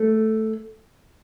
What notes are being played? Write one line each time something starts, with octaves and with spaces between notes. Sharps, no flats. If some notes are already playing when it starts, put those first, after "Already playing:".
Already playing: A3